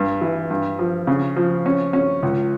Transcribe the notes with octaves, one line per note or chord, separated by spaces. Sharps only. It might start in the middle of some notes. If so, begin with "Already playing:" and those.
Already playing: G2
E3
G2
F3
C#3
F3
C#4
C#4
C#2